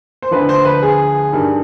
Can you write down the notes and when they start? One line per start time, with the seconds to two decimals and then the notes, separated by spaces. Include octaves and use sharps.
0.22 C5
0.31 D2 D3 F3 B4
0.49 C5
0.65 B4
0.83 G#4
1.33 G2 D#3